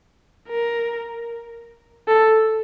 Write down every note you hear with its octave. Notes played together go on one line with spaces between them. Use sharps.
A#4
A4